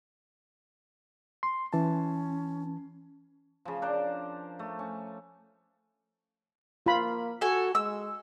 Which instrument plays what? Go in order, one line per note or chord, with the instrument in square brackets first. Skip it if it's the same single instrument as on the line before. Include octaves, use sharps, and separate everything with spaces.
[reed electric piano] C6
[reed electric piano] E3 A5 [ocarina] C#4
[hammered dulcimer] C#3 F3
D4 A#4 C5
A3
C#4
[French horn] A#3 [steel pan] F4 B5
[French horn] F#4 [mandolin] A4 G#5
[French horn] G#3 [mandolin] E6